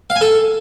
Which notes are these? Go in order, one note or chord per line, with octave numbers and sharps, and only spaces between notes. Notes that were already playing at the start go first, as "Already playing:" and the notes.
F5
G#5
A4